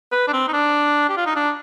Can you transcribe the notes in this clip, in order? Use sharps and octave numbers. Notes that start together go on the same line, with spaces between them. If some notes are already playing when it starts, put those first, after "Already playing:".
B4
D4
C4
D#4
D4
G4
F4
D#4
D4